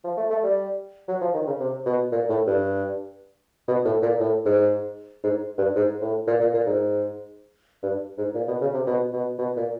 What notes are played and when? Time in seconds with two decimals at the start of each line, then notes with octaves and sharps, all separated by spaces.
0.04 F3
0.17 A3
0.30 A3
0.43 G3
1.08 F#3
1.21 F3
1.34 D#3
1.47 C#3
1.60 C3
1.86 B2
2.12 A#2
2.29 A2
2.47 G2
3.68 B2
3.85 A2
4.02 A#2
4.20 A2
4.46 G#2
5.24 G#2
5.58 G2
5.76 G#2
6.01 A2
6.27 A#2
6.40 A#2
6.54 A#2
6.67 G#2
7.83 G2
8.18 G#2
8.35 A#2
8.48 B2
8.61 C#3
8.74 C3
8.87 B2
9.13 B2
9.39 B2
9.57 A#2